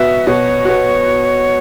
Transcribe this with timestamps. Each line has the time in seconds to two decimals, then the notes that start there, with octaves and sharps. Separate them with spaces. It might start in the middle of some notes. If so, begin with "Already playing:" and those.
Already playing: B2 B3 F#4 E5
0.27 B2 C#5
0.65 B3 F#4